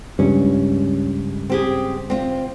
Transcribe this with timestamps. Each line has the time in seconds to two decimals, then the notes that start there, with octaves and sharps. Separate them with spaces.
0.19 C#2 G2 C#4
1.50 C4 G4 G#4
2.10 C4 F4